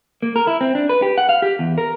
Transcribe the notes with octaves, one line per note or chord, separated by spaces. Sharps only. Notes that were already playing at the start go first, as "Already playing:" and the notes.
A#3
A#4
E4
C4
D4
B4
G4
F#5
F5
G4
E2
A#4